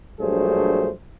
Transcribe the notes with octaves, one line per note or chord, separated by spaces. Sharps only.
A#1 G2 F#3 A3 G#4 C5